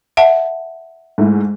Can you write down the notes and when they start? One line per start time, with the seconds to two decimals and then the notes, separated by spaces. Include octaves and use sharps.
0.17 E5 F#5 A5
1.18 G#2 A3 E4